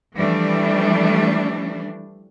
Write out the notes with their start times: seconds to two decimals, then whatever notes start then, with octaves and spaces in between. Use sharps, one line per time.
0.16 E3 F3 G3 A3 D4